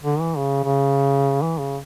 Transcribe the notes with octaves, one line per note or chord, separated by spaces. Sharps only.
D3
E3
C#3
C#3
E3
C#3